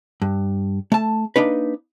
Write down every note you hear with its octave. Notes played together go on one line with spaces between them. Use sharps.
G2
A3 A5
A#3 D4 D#4 B4